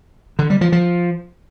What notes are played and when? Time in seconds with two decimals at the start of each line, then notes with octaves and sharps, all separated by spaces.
0.39 D3
0.50 G3
0.61 F3
0.72 F3